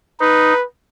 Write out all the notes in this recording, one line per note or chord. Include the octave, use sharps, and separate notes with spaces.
D#4 B4